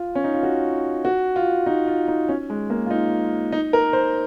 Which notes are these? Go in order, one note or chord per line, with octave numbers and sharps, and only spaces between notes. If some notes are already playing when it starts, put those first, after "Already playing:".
Already playing: F4
C#4
D#4
F4
F#4
F#4
F4
D#4
F4
D#4
C#4
G#3
A#3
F4
D#4
D#4
A#4
C5